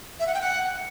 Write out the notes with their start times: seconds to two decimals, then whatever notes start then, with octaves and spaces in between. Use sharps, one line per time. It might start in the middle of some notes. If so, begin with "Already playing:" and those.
0.19 E5
0.27 F#5
0.34 G5
0.42 F#5